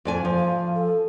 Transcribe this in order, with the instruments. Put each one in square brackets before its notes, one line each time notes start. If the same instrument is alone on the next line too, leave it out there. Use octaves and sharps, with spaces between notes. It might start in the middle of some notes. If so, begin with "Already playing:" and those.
[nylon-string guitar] F2 D5 G#5
F3
[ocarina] F5
A4